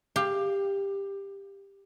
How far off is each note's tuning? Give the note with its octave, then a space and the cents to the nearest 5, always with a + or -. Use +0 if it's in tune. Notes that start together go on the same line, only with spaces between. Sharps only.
G4 +15 F5 -5